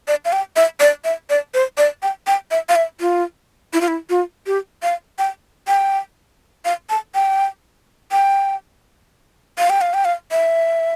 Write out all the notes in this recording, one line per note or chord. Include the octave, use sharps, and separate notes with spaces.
D5
F5
G5
E5
D5
E5
D5
C5
D5
G5
G5
E5
F5
E5
F4
E4
F4
E4
F4
G4
F5
G5
G5
F5
A5
G5
G5
F5
G5
F5
G5
F5
E5